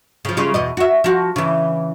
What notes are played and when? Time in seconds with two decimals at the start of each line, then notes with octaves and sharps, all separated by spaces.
0.25 C#3 F3
0.37 C#3 G3 F4
0.54 E2 B2 D#5
0.77 F#4 E5
1.04 F3 F#4
1.36 C#3 E3